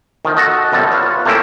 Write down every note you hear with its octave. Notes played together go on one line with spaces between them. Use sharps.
D#3 F3
F#4 A4 D#5
F#2 B2 F3 G3 A4
F4 B4 C#5
A3 A#3 C4 C#4 E4 G4